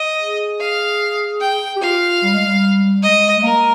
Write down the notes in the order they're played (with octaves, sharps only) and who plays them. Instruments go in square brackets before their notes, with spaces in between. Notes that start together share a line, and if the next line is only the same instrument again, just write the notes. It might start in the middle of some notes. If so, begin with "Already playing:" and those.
Already playing: [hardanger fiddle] D#5
[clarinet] G#4
[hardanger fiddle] F5
G5
[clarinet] G4
[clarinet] F4 [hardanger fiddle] F5
[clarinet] G3
G#3
G3
[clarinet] G#3 [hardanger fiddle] D#5
[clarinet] G#3
[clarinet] A#3 [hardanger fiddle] A#4